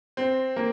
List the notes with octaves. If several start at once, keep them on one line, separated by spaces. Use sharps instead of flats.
C4
A#3